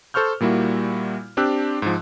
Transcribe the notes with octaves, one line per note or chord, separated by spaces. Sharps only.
A4 C5 C#6 F6 G6
A#2 G3 A#3 E4 F#4
C4 D4 G4 E6 F#6
G#2 F3